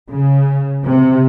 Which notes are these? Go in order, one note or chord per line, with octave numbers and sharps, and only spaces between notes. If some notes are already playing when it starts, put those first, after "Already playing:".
C#3
C3